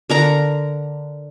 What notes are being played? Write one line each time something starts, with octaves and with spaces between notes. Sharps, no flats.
D3 A#4 A#5